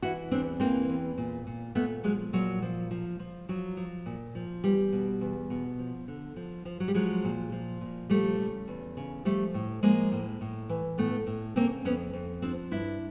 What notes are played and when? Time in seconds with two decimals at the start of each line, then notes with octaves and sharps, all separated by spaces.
0.02 E3 E4 F#4
0.31 E2 C4 D4
0.60 E3 A#3 C4
0.90 E2
1.18 A#2
1.47 A#2
1.75 A#2 A3 B3
2.04 F3 F#3 G#3
2.33 A#2 F#3
2.62 F3
2.91 F3
3.19 F3
3.49 F3 F#3
3.77 F3
4.06 A#2
4.35 F3
4.64 E2 G3
4.93 B2
5.21 E2
5.50 B2
5.79 F3
6.08 D3
6.36 F3
6.65 F3
6.80 F#3
6.88 G3
6.94 F3 F#3 G#3
7.24 A#2
7.52 F3
7.81 A#2
8.10 F3 G3 A3
8.39 C#3
8.68 E2
8.97 C#3
9.25 F3 G3 A3
9.54 A2
9.83 F3 G#3 A#3
10.12 A2
10.41 A2
10.69 E3
10.98 A2 A3 B3
11.27 A2
11.56 C#3 A#3 C4
11.85 F2 B3 C#4
12.13 F2
12.42 F3 C4 D4
12.71 G2 D4 E4